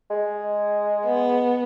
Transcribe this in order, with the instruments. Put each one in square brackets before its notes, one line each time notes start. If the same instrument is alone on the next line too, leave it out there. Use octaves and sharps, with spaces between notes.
[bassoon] G#3
[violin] B3